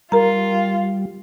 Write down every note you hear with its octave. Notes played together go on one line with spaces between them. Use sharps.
G3 F4 A#4 A#5